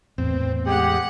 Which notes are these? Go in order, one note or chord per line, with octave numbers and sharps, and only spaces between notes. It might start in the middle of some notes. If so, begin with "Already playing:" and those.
E2 A2 B3 C4
G#3 G4 F#5